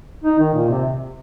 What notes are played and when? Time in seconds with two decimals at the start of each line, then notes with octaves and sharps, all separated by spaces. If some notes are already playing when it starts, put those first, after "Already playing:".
0.24 D#4
0.39 D#3
0.54 A#2
0.69 C3